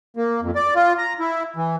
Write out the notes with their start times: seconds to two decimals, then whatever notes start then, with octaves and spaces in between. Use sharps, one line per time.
0.17 A#3
0.42 F2
0.55 D5
0.75 F4
0.98 A#5
1.20 E4
1.56 E3